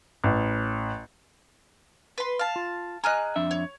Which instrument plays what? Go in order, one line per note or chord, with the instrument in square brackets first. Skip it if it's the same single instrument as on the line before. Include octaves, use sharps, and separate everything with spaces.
[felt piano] A1
[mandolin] B4 C6
F5 A5
[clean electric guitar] F4
[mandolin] G#4 F6 F#6 [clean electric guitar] D#5 G#5 A#5
[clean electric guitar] F2 D4 E5
[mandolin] C#5